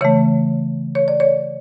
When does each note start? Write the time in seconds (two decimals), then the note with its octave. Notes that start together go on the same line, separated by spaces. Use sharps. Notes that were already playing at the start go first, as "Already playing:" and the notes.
0.01 C#3 E3 A3 C#5
0.95 C#5
1.08 D5
1.20 C#5